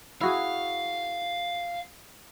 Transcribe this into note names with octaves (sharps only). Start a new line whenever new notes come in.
E4 F#4 G#4 F5